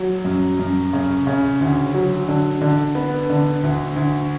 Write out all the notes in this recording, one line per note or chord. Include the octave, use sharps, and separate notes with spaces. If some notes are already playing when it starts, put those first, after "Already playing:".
Already playing: F#3
F#2
F#2
C#3
C#3
D2
F#3
D3
D3
B3
D3
D2
D2